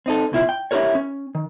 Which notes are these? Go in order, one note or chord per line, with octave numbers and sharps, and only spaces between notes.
C4 D#4 A4
C#2 B2 E4 F4
G5
D4 E4 F4 G4 A#4 C#5
C#4
D#3